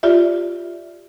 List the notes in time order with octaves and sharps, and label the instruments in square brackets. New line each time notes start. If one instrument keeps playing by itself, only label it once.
[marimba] F4 G4 D5 E5